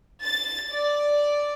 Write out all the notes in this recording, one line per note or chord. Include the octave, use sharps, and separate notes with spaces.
A6
D5